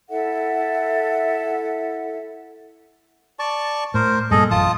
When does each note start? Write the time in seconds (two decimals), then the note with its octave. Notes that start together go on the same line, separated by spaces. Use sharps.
0.09 E4 A4 E5 F#5
3.39 D5 A5 C#6
3.94 A2 A#4 C5
4.31 G2 A#2 G#4 A4 D#5
4.51 A1 F#2 F4 A5 D#6